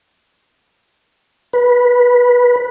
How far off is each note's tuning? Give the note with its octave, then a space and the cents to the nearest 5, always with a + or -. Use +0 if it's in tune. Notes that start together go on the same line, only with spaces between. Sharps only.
B4 -15